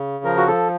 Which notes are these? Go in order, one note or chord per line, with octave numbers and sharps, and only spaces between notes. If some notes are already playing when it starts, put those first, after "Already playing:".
Already playing: C#3
F3 A#4
F#4
A4